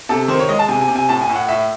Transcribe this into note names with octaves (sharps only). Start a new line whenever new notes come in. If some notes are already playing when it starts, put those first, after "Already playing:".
C3 A4
D#3 C5
C#5
G#3 D#5
A5
C3 G#5
G#5
C3
G#5
A2 A5
G#5
A2
F#5
A2 E5